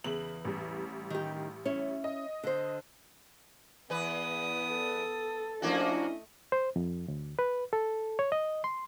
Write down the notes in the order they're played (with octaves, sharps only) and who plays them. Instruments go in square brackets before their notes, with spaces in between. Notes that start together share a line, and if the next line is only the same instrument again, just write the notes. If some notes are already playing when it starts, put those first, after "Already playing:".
[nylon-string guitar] E2 [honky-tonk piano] C#3 F#7
[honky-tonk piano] A1 G3
[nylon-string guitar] D#3 G4
C#4 E4 C#5
[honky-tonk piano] D#5
[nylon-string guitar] D3 C5
[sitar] E2 B4 [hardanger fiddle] B3 D#6
[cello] A4
[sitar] F3 A#3 F#4 [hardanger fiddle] A3 D#5 [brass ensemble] C#4 D4 E4
[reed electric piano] C5
F2
D2
B4
A4
C#5
D#5
C6